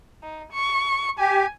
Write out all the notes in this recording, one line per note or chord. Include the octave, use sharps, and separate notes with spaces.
D#4
C#6
G4 G#5